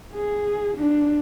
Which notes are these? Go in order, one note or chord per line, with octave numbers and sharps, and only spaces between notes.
G#4
D4